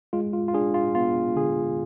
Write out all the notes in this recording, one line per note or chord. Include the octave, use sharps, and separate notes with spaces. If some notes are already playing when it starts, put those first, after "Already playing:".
G#3 F4
F4
F4
D4 G#4
F4
B3 F4
D3 G#4